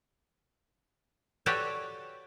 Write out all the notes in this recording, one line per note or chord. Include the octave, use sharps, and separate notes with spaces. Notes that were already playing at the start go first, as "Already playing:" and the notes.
F#4 G4 A4 B4 C#5 D5